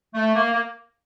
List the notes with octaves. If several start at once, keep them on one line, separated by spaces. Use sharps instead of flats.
A3
A#3
A#3